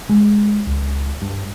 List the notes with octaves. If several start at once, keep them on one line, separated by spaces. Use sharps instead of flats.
G#3
C#2
G2